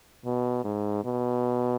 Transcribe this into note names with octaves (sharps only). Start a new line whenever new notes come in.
B2
G#2
B2